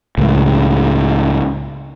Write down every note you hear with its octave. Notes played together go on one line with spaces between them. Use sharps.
C#2 A2